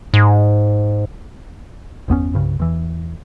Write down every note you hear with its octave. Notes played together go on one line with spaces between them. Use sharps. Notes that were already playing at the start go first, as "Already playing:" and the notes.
G#2
G1 E2 B3 C#4
C2 G2 C#3
E2 E3